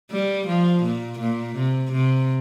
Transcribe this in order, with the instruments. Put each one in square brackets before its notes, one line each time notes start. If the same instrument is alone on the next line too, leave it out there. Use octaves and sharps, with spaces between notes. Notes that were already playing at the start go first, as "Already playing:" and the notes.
[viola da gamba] G3
F3
A#2
A#2
C3
C3